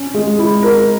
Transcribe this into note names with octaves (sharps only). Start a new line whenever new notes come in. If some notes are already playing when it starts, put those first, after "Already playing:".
Already playing: C#4
G#3
E4
A#4